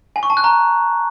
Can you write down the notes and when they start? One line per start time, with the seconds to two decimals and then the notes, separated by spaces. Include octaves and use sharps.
0.16 G#5
0.23 C#6
0.30 A5
0.37 F#6
0.44 A#5